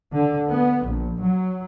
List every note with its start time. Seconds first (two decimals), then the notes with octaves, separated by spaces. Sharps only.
0.13 D3
0.49 B3
0.86 A#1
1.21 F#3